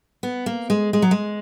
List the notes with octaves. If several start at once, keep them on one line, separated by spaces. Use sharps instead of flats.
B3
A#3
G#3
G#3
F#3
G#3